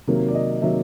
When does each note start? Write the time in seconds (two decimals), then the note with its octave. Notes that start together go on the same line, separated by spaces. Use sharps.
0.08 C3 D#3 F#3 A#3
0.28 D5
0.34 D#5
0.62 C3 D#3 F#3 A#3 E5